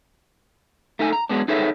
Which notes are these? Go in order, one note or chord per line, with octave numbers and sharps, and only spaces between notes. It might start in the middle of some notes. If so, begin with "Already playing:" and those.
A3 D#4 A4 G#5
A#5
F#3 G#3 B3 D4
D#4 G#4 A4 B4 C#5 E5